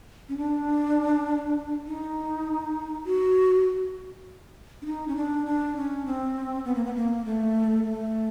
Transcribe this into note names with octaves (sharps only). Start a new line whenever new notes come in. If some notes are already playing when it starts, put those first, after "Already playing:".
C#4
D4
D#4
F#4
D4
D#4
C#4
D4
D4
C#4
C4
B3
A#3
B3
A#3
A3
A3